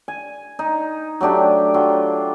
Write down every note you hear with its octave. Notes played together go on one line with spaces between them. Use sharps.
G#5
D#4
F#3 A3 D4 G4
F#3 F4 G5